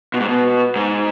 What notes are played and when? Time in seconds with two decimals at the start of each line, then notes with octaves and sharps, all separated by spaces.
0.14 B2
0.20 G#2
0.28 B2
0.76 G#2